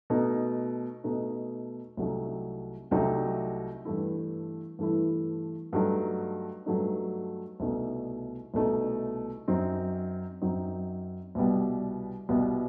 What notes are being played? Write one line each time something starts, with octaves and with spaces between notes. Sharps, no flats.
B2 A3 D#4
B2 A3 D#4
C2 C3 F#3 A3 D#4
C2 C3 F#3 A3 D#4
G2 E3 A3 E4
G2 E3 A3 E4
G2 F#3 A3 D#4
G2 F#3 A3 D#4
C2 B2 A3 D#4
C2 B2 A3 D#4
F#2 F#3 C4 D#4
F#2 F#3 C4 D#4
C2 B2 G3 B3
C2 B2 G3 B3